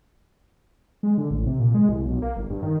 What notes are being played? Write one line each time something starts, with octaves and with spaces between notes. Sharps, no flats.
G#3
D3
A1
C3
A#2
G#3
C2
B1
A#3
G1
G2
D#3